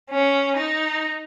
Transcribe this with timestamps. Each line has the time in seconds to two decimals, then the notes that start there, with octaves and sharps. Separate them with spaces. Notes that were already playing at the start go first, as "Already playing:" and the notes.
0.10 C#4
0.57 D#4